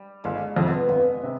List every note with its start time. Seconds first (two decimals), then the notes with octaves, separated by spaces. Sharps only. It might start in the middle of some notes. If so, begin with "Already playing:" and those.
Already playing: G3
0.24 G1 G#3
0.56 F2 C3
0.68 B3
0.89 G1 B3
1.24 C3